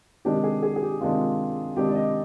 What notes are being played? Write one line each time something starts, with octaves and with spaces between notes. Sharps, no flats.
C3 D#3 G#3 D4 G4
G#4
G#4
G#4
G4
C3 D#3 G#3 D4 F4
C3 D#3 G#3 D4 G4
D5
D#5